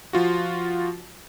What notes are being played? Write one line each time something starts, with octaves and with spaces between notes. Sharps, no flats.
F3 F4 F#4